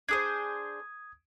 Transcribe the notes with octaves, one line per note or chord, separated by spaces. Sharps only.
D4 G#4 C5 D#6 G#6